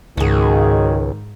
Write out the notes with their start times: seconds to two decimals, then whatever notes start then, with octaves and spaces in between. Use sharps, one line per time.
0.17 C#2 G#2 D#3 F#4 G#4